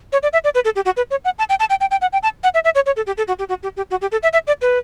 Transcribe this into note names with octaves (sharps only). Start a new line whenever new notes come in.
C#5
D5
E5
D5
B4
A4
G4
F#4
B4
C#5
F#5
A5
G5
A5
G5
G5
G5
F#5
G5
A5
F#5
E5
E5
C#5
C#5
A4
G4
A4
F#4
G4
F#4
G4
G4
F#4
G4
A4
E5
E5
D5
B4